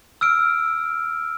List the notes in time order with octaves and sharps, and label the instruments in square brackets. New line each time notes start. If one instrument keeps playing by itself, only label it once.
[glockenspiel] E6 F6 D7